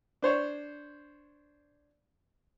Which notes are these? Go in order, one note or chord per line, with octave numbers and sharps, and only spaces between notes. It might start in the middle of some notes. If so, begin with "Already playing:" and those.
D4 C5 C#5